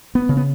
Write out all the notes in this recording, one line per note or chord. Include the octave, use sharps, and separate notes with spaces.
B3
C#3
B3